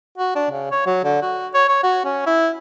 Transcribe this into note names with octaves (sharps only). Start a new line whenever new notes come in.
F#4
D4
C#3
C#5
F#3
D3
F#4
C#5
C#5
F#4
C#4
E4